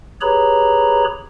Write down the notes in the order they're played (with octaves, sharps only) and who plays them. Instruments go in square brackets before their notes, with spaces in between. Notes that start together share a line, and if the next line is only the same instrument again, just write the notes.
[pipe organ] G4 G#4 B4 C#5 A#5 B5